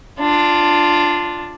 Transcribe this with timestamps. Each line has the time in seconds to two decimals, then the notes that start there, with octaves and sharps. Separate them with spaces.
0.20 D4 F4